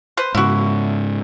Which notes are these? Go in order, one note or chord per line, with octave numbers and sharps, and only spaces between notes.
B4 C5
G#2 C#3 E4 F#4